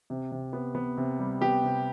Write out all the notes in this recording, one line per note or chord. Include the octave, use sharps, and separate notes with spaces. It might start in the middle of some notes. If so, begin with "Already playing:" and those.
C3
C3
B3
B3
C3
G3
B3 G4
C3